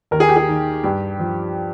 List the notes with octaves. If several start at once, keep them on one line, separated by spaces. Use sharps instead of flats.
D#2 A#4
G#4
G4
G#4
D#3
G2 G4
F3